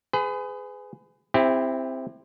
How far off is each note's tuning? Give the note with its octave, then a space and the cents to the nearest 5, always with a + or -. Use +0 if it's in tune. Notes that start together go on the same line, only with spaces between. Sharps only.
G#4 +0 B4 +35
C4 +0 E4 +0 G4 +40